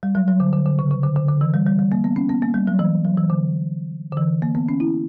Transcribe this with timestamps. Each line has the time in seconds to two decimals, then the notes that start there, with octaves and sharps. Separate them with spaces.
0.03 G3
0.15 F#3
0.28 F#3
0.40 D3
0.53 D3
0.66 D3
0.79 C#3
0.91 C#3
1.03 D3
1.16 D3
1.29 D3
1.41 E3
1.54 G3
1.67 G3
1.79 G3
1.92 A#3
2.04 B3
2.16 C#4
2.29 B3
2.42 A#3
2.54 G3
2.67 F#3
2.79 E3
3.05 F#3
3.17 E3
3.30 D3
4.12 D3
4.17 E3
4.42 A#3
4.55 B3
4.69 C#4
4.80 E4